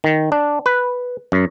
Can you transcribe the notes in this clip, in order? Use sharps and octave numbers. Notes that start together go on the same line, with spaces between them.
D#3
D4
B4
F#2